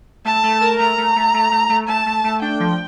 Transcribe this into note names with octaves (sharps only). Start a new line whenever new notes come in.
A3 A5
A3
A#4
A3 A#5
A3
A3
A3
A3
A3
A3 A5
A3
A3
D4 G5
F3